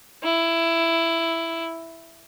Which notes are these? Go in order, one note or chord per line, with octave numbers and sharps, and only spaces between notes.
E4